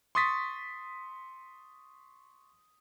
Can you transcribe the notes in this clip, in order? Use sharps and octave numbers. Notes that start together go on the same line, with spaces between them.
C6 C#6 D#6 A6 B6